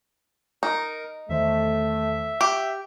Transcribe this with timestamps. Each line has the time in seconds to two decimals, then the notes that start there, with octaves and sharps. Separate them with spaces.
0.63 D#4 A#4
1.29 E2 D#3 A3 C5 E5
2.41 G4 F#5 G5